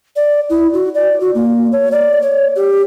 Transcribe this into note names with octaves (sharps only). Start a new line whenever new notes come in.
D5
E4
F#4
D5
F#4
A#3
C#5
D5
C#5
G4